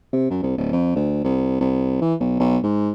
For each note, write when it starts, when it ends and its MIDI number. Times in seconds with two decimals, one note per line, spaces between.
0.13 0.28 48
0.30 0.39 42
0.43 0.53 36
0.57 0.72 26
0.73 0.91 41
0.96 1.23 38
1.24 1.59 36
1.61 1.99 36
2.01 2.15 52
2.20 2.36 35
2.40 2.58 35
2.63 2.92 44